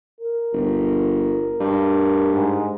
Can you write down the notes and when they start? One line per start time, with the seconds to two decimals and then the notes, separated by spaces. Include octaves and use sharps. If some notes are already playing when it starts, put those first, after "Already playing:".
0.21 A#4
0.53 G1
1.60 G2
2.31 G#2